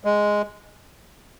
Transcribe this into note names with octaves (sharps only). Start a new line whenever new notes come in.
G#3